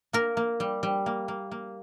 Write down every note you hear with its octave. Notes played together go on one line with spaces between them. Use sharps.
A#3 A#4
A#3
G3
G3
A#3
A#3
A#3